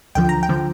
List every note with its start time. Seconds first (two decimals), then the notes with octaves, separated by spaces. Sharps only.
0.15 D2 D3 F3 G5
0.29 A#5
0.43 G5
0.49 D3 F3